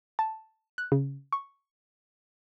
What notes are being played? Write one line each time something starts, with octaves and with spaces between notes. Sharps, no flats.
A5
F#6
C#3
C#6